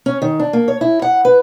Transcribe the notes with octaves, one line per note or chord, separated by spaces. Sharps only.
C#4
D#3
D4
A#3
C#5
E4
F#5
B4